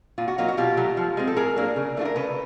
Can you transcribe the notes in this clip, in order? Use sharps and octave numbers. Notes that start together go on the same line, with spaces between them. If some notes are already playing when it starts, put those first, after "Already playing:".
A#2 F4
F#4
F#3 A#3 D#4 F4
F#4
B2 F4 G4
F#3 A3
F3
G#3 C4
A4
A2 G#4 A#4
F#3 A#3 D4
C#3
E3 A3 D4 F4
A#4
C#3 A4 B4